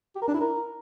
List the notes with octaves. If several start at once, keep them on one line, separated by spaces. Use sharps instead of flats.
G4
A#4
D4
E4
A#4